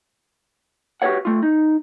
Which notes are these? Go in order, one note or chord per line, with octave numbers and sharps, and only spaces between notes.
F#4 G4 A4 B4 C#5 F#5
A3 F4
D#4